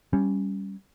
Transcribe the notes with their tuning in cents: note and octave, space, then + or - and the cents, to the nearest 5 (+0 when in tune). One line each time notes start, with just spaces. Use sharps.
G3 +0 C#4 +0